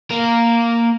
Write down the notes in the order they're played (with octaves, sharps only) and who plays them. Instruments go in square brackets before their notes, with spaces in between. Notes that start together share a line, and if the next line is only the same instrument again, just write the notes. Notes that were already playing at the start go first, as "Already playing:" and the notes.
[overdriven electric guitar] A#3 A#4